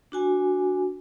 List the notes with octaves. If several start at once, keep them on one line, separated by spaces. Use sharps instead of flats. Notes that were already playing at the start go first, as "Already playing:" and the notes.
D4 F#4 G#5